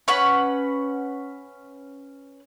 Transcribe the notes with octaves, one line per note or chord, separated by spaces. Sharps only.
C#4 B4 F#5